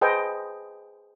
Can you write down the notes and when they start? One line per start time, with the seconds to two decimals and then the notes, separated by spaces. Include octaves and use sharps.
0.01 G#4 B4 C5 D#5 G5 A5